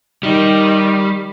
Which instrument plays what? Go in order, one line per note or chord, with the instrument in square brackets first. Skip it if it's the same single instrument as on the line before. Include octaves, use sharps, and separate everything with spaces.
[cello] D#3 [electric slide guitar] G3